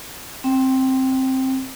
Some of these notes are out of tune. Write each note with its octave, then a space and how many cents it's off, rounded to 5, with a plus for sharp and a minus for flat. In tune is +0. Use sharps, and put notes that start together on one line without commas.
C4 +10 G5 -10